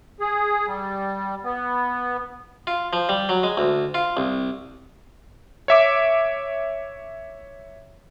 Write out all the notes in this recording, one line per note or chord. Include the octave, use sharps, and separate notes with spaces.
G#4
G3
B3
F4
F3
G3
F#3
G#3
D2
F4
C2
C#5 E5 D6